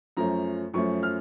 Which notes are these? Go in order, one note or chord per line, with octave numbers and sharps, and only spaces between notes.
F#2 F3 A3 C#4 A#5
F#2 F3 A3 C#4 C#6
F6